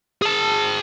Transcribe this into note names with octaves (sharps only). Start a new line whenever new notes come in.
G#4 A5